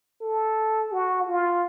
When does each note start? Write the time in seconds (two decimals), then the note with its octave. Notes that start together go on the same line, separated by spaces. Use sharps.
0.22 A4
0.92 F#4
1.28 F4